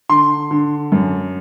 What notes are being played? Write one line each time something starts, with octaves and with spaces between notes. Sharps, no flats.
D3 C6
D3
F#2